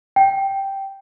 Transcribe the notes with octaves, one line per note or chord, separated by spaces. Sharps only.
G5